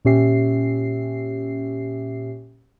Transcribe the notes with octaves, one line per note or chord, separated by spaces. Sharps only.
A#2 C#4 G4 E5 C7